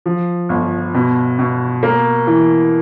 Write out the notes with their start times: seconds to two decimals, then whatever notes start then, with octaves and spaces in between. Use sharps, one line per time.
0.06 F3
0.49 G1
0.94 B2
1.39 B2
1.83 A#3
2.27 E3